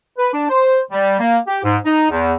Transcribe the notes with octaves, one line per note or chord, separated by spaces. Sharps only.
B4
D4
C5
G3
A#3
G4
G#2
D#4
E2